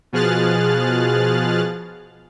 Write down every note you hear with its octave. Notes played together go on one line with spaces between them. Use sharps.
B2 F3 G#4 F6 F#6 A6